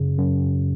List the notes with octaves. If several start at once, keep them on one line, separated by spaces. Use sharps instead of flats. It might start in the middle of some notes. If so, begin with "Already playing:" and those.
Already playing: F#2 C#3
F#2